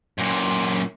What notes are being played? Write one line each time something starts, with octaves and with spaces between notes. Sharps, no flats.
F#2 A#2